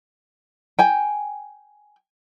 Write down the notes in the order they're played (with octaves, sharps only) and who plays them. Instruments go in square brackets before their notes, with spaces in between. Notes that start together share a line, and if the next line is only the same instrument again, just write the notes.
[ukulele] G5 G#5